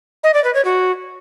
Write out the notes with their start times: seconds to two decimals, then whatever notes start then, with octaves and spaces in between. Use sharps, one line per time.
0.23 D#5
0.34 D5
0.44 B4
0.54 C#5
0.65 F#4